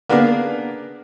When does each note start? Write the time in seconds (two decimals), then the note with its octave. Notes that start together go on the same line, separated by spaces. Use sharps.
0.09 A#3 B3 D4 G#4 A#4 D5